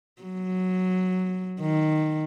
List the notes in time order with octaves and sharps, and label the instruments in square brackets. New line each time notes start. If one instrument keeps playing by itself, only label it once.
[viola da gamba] F#3
D#3